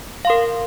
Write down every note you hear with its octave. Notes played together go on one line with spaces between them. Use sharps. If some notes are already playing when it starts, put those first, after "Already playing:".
A#4 F5 C6